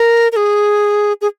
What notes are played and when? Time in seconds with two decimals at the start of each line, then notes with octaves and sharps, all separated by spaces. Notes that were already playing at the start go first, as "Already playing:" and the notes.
Already playing: A#4
0.32 A#4
0.36 G#4
1.21 G#4